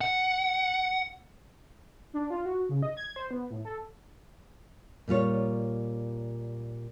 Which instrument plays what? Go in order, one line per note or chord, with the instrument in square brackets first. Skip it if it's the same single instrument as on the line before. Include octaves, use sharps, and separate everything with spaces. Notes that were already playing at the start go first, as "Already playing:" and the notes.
[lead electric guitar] F#5
[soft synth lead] D4
F4
F#4
C#3
D#5
G#6
C5
B3
A2
A4
[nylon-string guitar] A#2 G3 F4 C#5